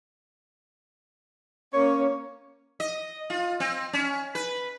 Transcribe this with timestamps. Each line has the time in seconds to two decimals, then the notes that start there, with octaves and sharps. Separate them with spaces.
1.73 A#3 C#4 C#5
2.80 D#5
3.30 F4
3.60 C4
3.93 C#4
4.35 B4